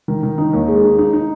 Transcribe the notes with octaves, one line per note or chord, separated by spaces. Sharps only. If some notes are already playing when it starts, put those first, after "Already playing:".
D#3
D#3
D#4
D#2
G#3
D#4
D#4
D#4